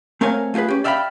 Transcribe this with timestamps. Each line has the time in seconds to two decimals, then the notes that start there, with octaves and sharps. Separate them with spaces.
0.21 A3 C4 A#4 C#5 F5 G#5
0.54 A3 F4 G4 G#4 B4
0.68 C#4 G4
0.84 D5 E5 F5 G5 G#5 B5